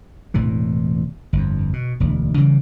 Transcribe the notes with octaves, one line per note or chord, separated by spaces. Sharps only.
E1 A2 C3 E3
G1 F2
B2
E1 D2
C#3 E3 G3